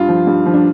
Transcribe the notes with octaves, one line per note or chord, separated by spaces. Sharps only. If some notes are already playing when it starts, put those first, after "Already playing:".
Already playing: G2 F4
F3
G2
F3
D4